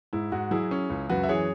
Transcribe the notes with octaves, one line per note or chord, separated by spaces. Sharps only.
G#2 E4
G#2 F#4
F#3 E4 G#4
C#4
C#2
F#2 F#4 B4
E5
E3 G#4 C#5